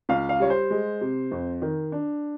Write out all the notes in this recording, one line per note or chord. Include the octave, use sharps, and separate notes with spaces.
C#2 F5
F5
G3 C#5
C5
G#3
C3
F2
D#3
D4